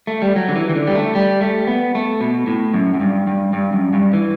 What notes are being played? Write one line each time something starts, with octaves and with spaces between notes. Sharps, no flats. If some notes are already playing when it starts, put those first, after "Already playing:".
A3
G3
F#3
D3
E3
E3
D3
G3
A3
G3
A3
B3
A3
B2
A2
F#2
F#2
G2
G2
G2
F#2
G2
E3